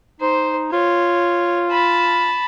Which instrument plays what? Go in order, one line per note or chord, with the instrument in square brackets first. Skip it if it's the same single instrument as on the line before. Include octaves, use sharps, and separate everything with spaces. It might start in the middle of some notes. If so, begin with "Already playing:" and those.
[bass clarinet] D#4 [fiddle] C5
[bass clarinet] F4 [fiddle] C#5
[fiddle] A5 B5